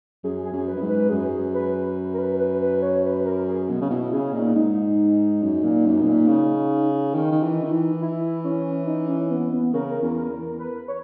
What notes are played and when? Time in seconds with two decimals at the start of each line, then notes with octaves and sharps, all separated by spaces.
0.23 F#2 G#4
0.45 G#4
0.53 F#2
0.68 B4
0.76 F#2
0.81 G#2
0.89 B4
1.10 F#2 G#4
1.54 B4
2.14 A#4
2.18 B4
2.39 B4
2.61 B4
2.82 C#5
3.05 B4
3.25 A#4
3.48 G#4
3.70 B2
3.81 C#3
3.90 B2 E4
4.13 C#3 G#4
4.33 A#2 D#4
4.55 G#2 D#4
5.42 F#2
5.63 A#2
5.86 F#2
6.01 B2
6.07 A#2
6.28 C#3
7.14 D#3 D#4
7.32 D#3
7.43 E3
7.64 D#3
7.72 E3
8.01 E4
8.44 C#4
8.87 D#4
9.08 C#4
9.30 B3
9.53 B3
9.74 C#3 A#4
10.02 E2
10.17 A#4
10.30 E2
10.59 B4
10.88 C#5